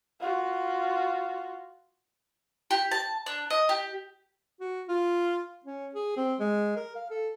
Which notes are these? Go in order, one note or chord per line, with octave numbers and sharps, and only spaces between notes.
F4 F#4
G4
A5
D4
D#5
G4
F#4
F4
C#4
G#4
C4
G#3
A#4
F5
A4